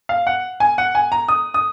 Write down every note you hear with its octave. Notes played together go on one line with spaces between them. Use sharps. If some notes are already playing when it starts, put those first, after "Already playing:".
F5
F#5
G#5
F#5
G#5
A#5
D#6
D#6